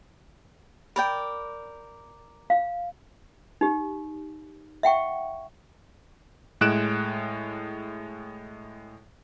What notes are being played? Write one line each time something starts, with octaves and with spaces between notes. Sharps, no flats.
A#4 D5 G5 B5
F5
D#4 G4
E5 F#5 G5 C#6
A2 G#3 F#6 D7 E7